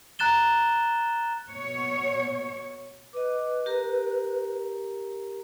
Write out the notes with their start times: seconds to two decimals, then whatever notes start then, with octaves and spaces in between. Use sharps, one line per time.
0.19 A#5 F#6 A6 E7 G7
1.49 B2 C#5
3.13 B4 D#5 D6
3.66 G4 A#4 A#5